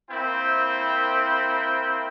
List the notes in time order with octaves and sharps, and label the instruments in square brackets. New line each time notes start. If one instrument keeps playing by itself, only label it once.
[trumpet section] A#3 C4 E4 C5 G5